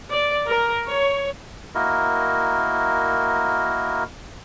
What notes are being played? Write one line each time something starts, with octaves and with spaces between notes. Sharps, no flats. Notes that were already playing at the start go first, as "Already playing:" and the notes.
D5
A#4
C#5
A#3 E4 F#4 A#4 D#5